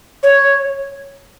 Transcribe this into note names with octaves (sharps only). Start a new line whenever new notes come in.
C#5